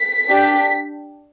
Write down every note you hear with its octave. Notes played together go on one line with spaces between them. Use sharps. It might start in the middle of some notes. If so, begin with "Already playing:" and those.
Already playing: B6
D4 G4